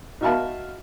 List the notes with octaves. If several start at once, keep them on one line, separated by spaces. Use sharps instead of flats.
D#4 F#4 E5 F5 A5 B5